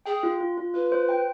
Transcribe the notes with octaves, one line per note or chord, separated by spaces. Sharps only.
G#4 G5
F4
F4
F4
F4 B4
C5
G5